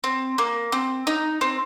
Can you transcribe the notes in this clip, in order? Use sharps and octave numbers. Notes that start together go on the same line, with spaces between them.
C4
A#3
C4
D#4
C4